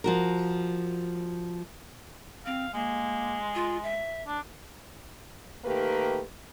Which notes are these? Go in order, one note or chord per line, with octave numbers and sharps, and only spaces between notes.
F3 F#4 A#4
C4 F5
G#3 A#3
F4
E5
D4
D#3 A3 A#3 G4 A#4 B4